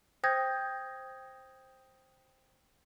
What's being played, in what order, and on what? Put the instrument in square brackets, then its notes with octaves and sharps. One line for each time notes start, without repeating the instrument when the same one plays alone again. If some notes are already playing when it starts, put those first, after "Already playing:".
[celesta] C5 G5 D#6 G6 G#6 A#6